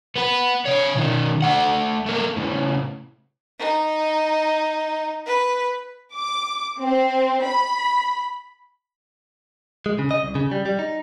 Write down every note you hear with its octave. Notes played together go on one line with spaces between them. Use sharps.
B3 B4
C3 C#5
B1 D#3
A3 F#5
A3 A#3
A2 C#3
D#4
B4
D6
C4
B5
G#3
C#3
D#5
C2
C#3
G3
G3
D#4